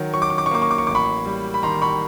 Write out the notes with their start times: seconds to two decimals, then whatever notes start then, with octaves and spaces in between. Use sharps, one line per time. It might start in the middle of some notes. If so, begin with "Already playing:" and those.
Already playing: D#3 F#3
0.14 F#3 C#6
0.22 D6
0.30 C#6
0.38 D6
0.46 C#6
0.51 A#3 D6
0.62 C#6
0.71 D6
0.78 C#6
0.87 A1 D6
0.95 B5 C#6
1.26 G3
1.54 B5
1.63 D#3 A#5 C6
1.82 B5 C#6